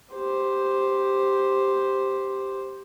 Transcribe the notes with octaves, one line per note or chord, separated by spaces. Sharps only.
G4 C5